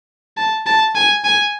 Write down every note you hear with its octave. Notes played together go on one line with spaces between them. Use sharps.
A5
A5
G#5
G#5